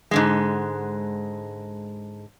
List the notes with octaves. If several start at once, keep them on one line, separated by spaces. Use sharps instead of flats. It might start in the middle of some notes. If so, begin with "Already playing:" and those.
G#2 D3 G#3